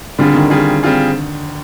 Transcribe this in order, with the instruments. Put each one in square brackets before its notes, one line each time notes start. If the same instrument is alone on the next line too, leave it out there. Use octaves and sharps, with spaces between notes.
[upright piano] D3 [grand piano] G3 C4 F4 G#4
[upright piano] D#3
[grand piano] G3 C4 F4 G#4
G3 C4 F4 G#4